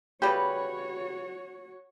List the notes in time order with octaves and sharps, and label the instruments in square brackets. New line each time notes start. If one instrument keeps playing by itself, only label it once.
[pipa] C#3 G3 B4 [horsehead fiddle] F#4 C#5 [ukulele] G4